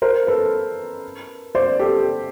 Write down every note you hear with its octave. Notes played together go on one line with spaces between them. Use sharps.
A#4 C5
A4 B4
C5 D5
G4 A4